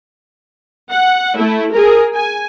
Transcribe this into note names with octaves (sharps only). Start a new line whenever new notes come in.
F#5
A3 E4
G#4 A#4
G#5